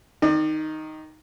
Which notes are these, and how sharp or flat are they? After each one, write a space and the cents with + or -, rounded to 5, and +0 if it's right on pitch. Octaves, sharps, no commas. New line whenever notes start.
D#3 +0 D5 +40